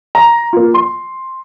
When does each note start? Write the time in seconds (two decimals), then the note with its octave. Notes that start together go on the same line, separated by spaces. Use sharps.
0.15 A#5
0.53 A#3 F4
0.74 C6